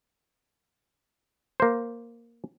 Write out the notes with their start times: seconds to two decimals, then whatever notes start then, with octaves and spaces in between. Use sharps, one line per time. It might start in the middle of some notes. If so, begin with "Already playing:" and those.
1.60 A#3 C5